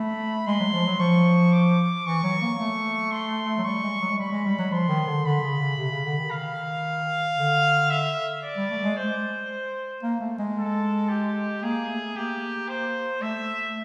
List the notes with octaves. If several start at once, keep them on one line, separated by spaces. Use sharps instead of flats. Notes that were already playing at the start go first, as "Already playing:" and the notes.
Already playing: A3 B5
G#3 C6
F#3
F3
F#3
F3 C#6
D6
E3 C#6
F#3
A#3
A3
C6
F#3
G3 C#6
G#3
F#3
G#3
G3 B5
G#3
G3
F#3
F3 C6
D#3
D3
D3 B5
C#3
C#3
C3
C#3
D3
D#3
F5
D3
E5
D5
G3
A3
G#3
C5
A#3
A3
G#3
A4
G4
A#3 G#4
A3
A#3 G4
C5
A3 E5